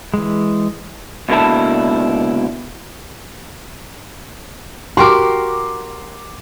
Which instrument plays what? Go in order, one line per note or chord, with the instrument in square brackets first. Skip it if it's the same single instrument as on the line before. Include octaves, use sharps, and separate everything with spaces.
[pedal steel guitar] E3 G#3
[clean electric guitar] C#2 B2 D3 A#3 E4 A5
[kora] F#4 G4 A#4 [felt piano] C6 D6